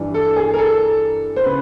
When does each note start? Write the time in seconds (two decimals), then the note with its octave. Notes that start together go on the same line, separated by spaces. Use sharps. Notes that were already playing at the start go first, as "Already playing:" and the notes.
Already playing: G2 E3
0.14 A4
0.36 G#4
0.53 A#4
0.58 A4
1.36 C5
1.44 C#3 B4